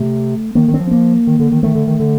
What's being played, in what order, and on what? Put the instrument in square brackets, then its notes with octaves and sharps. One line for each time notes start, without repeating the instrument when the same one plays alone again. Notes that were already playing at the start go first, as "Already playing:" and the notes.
Already playing: [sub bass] C3 [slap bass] A3
[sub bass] D#3 [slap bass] A#3
[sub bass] D#3
[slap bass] C4
[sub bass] F3
[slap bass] A#3
[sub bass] D#3
D3
D#3
[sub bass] D#3 [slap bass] A3
[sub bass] D3
D#3
D3